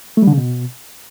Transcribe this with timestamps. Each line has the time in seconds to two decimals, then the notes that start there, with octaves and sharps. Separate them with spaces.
0.17 A3
0.22 G3
0.27 D3
0.32 C#3
0.37 B2